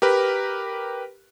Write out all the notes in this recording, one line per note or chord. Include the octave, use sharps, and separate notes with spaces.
G4 A#4 B4